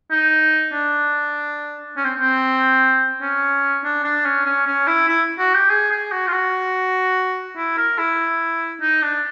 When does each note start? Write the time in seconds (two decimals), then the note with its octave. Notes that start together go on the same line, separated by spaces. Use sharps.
0.11 D#4
0.73 D4
1.97 C#4
2.05 C4
2.19 C4
3.21 C#4
3.84 D4
4.04 D4
4.25 C#4
4.46 C#4
4.66 C#4
4.87 E4
5.08 E4
5.39 F#4
5.54 G4
5.70 G#4
5.91 G#4
6.12 F#4
6.27 F4
6.32 F#4
7.57 E4
7.77 A#4
7.98 E4
8.81 D#4
9.02 D4